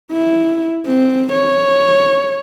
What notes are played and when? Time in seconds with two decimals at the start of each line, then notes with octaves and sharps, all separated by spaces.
0.12 E4
0.87 C4
1.33 C#5